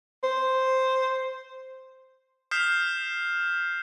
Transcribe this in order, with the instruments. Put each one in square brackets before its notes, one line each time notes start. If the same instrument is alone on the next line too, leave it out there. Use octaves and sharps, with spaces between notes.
[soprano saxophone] C5
[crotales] D#6 F6 G6 B6 C7 E7